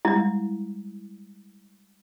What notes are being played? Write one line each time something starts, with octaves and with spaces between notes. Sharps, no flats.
G3 G#3 E4